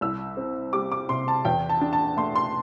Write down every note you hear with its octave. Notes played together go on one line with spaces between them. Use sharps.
C2 E6
C4
G3 D6
D6
C3 C6
A5
E2 G5
A5
D4
A5
A3 C6
C6